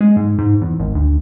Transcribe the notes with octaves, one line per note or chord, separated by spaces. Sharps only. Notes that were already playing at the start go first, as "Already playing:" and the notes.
G#3
G#2
G#2
E2
G#1
D2